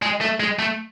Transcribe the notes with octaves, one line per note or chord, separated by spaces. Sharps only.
G#3
A3
G#3
A3